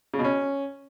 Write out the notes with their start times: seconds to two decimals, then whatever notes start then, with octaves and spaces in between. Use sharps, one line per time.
0.14 C#3
0.19 B2
0.24 C#4